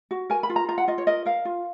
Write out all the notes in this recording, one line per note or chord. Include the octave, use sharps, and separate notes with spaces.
F#4
A#4 G#5
B5
F4
A#5
F4 A#5
F#5
F4 D#5
C#5
A#4 D#5
A#4 F5
F4